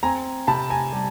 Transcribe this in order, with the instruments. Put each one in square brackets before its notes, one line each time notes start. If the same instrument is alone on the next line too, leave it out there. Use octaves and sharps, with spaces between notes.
[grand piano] C4 G#5 A#5
C3 A5 B5
G#5 A#5
G3